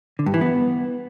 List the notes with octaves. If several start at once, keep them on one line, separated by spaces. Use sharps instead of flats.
D3
G2
E3
B3